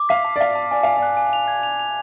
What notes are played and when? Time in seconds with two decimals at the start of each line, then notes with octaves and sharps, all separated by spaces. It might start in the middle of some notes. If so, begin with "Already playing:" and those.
Already playing: D6
0.09 F5 B6
0.24 A5
0.36 D5
0.40 F5 B6
0.55 A5
0.71 D5 G#5
0.83 F5 G#5
0.97 D5
1.02 F#6
1.17 G#5
1.33 F7
1.48 G#6
1.63 F7
1.79 F7